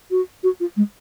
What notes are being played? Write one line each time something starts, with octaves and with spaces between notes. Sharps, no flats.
F#4
F#4
F4
G#3